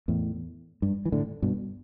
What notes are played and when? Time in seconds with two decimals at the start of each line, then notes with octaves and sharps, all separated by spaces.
0.08 E2 A2
0.82 G2
1.05 E3
1.12 A2 D3
1.42 G2 B2